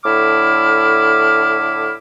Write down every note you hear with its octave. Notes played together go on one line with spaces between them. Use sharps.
A2 D3 E4 D6 F6